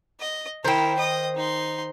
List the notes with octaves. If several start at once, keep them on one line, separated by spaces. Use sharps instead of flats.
D#5
D#3 E4 A#4 C5 G5
D#5 D#6
D#4 C6